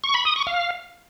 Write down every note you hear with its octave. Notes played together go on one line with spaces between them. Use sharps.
C#6
B5
D#6
C#6
F5